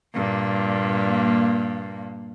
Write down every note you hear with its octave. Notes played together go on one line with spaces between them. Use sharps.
G2 A#2 A#3